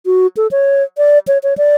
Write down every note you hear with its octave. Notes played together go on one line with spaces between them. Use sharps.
F#4
A4
C#5
D5
C#5
C#5
D5